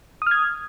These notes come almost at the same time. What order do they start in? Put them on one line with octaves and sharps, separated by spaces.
D#6 F6 G#6